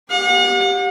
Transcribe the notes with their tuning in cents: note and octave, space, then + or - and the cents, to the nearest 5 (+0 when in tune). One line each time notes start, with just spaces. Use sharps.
G4 +0 F#5 -40